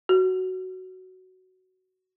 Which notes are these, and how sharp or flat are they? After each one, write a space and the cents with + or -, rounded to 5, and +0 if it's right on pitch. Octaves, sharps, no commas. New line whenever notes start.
F#4 +10